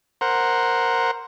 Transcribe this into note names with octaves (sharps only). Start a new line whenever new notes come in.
A#4 C5 F#5